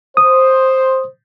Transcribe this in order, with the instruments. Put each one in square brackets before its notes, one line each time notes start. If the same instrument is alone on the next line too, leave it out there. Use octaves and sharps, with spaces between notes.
[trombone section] C5 [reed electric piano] D#6